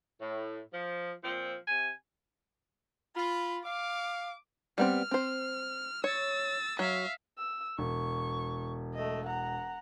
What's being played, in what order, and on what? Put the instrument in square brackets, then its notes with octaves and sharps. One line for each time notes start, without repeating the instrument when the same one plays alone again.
[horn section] A2
F3
A#2 F3 C4
C3 G#5
[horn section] F4 [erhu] B5
[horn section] F5 [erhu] D6
[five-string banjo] G3 B3 C4 [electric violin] F6
[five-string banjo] C4 C5
[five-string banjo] C#5 [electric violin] E6 A6
[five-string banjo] F#3 [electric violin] E5 F5
[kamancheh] E6
[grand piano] E1 [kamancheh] C#6
[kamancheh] A3 D#5
F#5 A#5